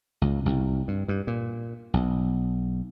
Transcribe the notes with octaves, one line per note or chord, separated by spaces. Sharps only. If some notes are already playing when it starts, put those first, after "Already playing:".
C#2
C2
G2
G2
A#2
B1